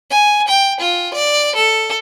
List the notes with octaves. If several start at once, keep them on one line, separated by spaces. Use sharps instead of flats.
G#5
G5
F4
D5
A4